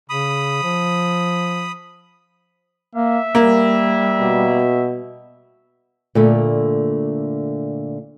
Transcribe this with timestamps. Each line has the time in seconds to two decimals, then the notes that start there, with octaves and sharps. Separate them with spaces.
0.10 C#3 B5 D#6
0.63 F3
2.95 A#3 E5
3.35 G3 A#3
4.21 B2
6.15 A#2 D3 A3